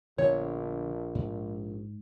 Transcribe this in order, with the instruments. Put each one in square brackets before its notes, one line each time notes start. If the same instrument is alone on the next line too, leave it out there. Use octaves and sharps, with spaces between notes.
[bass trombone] A#1 [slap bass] D3 F3 B3 [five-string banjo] C#5
[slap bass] G#2